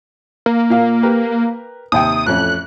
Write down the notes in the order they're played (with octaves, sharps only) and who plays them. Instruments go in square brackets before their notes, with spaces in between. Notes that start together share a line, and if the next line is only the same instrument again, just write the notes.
[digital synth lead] A#3
[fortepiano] A#2 F5
G4 A#4 B4
[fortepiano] D#2 C3 G5 [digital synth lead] D#6
[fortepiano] A1 F2 C#4 [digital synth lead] F#6